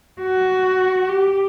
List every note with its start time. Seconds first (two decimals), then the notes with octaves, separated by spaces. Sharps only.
0.22 F#4
1.10 G4